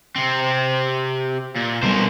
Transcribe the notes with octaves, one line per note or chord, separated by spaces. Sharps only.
C3 C4
A#2
B2 G3 A#4 C5